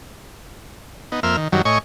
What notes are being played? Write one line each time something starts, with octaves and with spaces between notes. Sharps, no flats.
B3 D#4
F2 A#3 C5 E5 F6
D#3
F#2 D#3 F#3 G3
A2 C#5 D#5 G#5 C#6